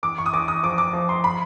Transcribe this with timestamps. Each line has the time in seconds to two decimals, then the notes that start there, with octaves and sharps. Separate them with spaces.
0.03 E2 D6
0.18 C#6
0.26 D#6
0.33 E2 D6
0.48 D#6
0.63 F3 D6
0.78 D6
0.93 F3
1.09 C6
1.24 B5